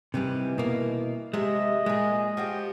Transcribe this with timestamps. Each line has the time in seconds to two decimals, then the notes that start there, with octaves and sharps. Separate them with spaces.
0.14 C3 D#3 E3 G3
0.58 B2 A#3
1.33 C3 G#3 D#5 E5
1.86 A#2 G#3 G#4
2.37 F3 F#4 G4